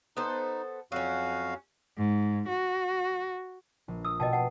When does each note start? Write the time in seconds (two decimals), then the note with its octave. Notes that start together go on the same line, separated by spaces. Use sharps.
0.17 B3 D#4 A4 C5
0.92 F2 F#3 C#4 F#4 F5
1.98 G#2
2.48 F#4
3.88 A#1
4.05 D#6 E6
4.20 B2 D#5 G5 A5
4.33 F#5 G5 A5